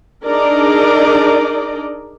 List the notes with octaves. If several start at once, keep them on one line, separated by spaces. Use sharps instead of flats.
D4 D#4 G#4 A#4 D5 D#5